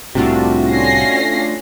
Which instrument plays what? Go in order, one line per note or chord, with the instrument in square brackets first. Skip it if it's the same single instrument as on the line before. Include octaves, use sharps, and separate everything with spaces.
[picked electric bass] C2 A2 C3 [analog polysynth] A3 D4 F4 [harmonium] F#4
[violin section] C#4 A#6 C7